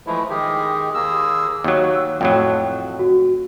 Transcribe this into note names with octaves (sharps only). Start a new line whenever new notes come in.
E3 F3 G#3 A3 E4
D#3 G#3 G4 G#4
D#2 A#3 G#4 E6
D#2 F#3
E6
F2 A2 F#3 G5
F#4